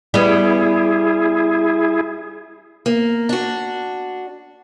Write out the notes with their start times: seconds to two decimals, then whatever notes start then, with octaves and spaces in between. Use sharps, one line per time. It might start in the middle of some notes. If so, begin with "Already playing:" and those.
0.14 G3 B3 E4 G#4
2.86 A#3
3.29 D4 F#4